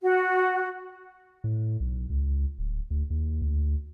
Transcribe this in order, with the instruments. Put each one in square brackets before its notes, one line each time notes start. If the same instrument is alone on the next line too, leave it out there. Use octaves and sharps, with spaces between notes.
[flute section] F#4
[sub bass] A2
B1
C#2
D1
D2
D#2
D2